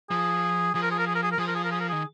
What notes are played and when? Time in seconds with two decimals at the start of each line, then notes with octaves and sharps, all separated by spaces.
0.10 F3 G#4
0.74 F3 G#4
0.82 A#4
0.91 G#4
0.99 A#4
1.07 G#4
1.15 A#4
1.23 G#4
1.32 A#4
1.38 F3 G#4
1.48 A#4
1.55 G#4
1.65 A#4
1.72 G#4
1.80 A#4
1.89 D#3 G#4